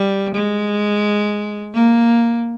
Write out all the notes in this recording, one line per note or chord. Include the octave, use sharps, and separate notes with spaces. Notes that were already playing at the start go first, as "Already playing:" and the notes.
Already playing: G3
G#3
A#3